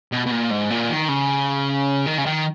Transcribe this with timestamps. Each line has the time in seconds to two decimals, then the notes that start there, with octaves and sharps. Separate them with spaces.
0.12 B2
0.26 B2
0.31 A#2
0.50 G#2
0.70 A#2
0.89 D#3
1.09 C#3
2.06 D#3
2.18 C#3
2.26 D#3